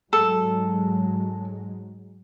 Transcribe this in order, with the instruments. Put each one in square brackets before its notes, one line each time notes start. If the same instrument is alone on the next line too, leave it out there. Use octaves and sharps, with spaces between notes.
[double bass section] G#2 F#3 G#3 [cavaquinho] A4